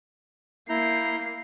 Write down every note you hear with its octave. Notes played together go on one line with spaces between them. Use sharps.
A#3 E4 A#5 G6 C7